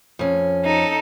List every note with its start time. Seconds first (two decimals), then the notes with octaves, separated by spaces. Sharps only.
0.19 F2 C#4
0.65 D#4 A4